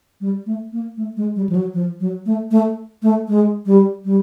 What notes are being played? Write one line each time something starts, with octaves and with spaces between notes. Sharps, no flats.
G3
A3
A#3
A3
G#3
G3
F3
F#3
F3
F#3
A3
A3
A3
G#3
G3
G3